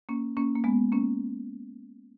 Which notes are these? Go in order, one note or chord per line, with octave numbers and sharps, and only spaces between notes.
A#3 C#4
A#3 C#4
A#3
G#3 B3
A#3 C#4